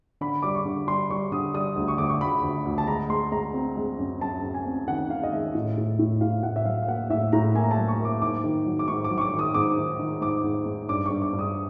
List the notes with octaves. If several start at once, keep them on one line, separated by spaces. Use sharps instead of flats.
D3 B5
G3 D6
C#6
D3
G3 C6
G3 C#6
D3 D#6
G3 D#6
D2
C#6
D2 D6
C#6
D2 B5
D2
D2
A5
G#3 A#5
G#3 C6
G#3 A#5
C4
G#3
F#2
F#2 A5
F#2
G#5
C4
D#3 F#5
D#3 F5
D#5
G#3 E5
A2
A2
A2
A2 F5
A2 F#5
E5
F#3 F5
F5
A#3 F#5
A2 E5
A2 A#5
A#3 G#5
A#5
A5
F#3
C#6
A#3
D6
G#2 D6
D#3
F#3
D6
G#2 C#6
D6
F#3
C#6
D6
D#3
D#6
G#2 D6
D#3
D#3
G#2 D6
G#2
G#2
G2 D6
G2 C#6
D6
G2
D#6